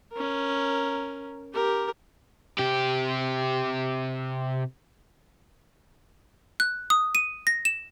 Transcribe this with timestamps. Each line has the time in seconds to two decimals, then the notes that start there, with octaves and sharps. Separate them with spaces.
0.13 C#4 A#4
1.54 G4 A#4
2.59 C3 G4
6.60 F#6
6.90 D#6
7.15 D#7
7.47 A#6
7.65 E7